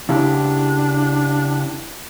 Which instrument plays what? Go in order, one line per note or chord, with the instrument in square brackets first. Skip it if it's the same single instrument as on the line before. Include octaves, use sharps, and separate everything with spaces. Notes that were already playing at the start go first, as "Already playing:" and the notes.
[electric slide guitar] C#3 E4 G4 [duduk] D4